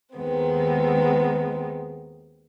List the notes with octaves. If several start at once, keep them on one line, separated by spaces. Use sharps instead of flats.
D#2 D#3 G#3 B3 C4